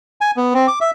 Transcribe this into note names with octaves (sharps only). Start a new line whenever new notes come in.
G#5
B3
C4
D6
E5